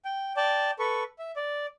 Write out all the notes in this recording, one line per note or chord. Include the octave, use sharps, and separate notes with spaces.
G5
D5 G5 A5
A4 B4 C#6
E5
D5